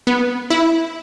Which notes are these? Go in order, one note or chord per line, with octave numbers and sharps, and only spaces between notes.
B3
E4